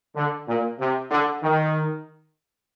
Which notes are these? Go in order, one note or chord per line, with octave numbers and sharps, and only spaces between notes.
D3
A#2
C3
D3
D#3